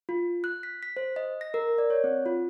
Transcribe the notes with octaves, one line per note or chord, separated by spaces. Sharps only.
F4
F#6
B6
B6
C5
D#5
A#6
A#4
D5
C#5
C4
F4